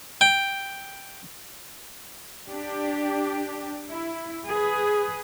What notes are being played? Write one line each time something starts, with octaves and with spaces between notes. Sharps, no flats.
G5
D4 G4
E4
G#4 B4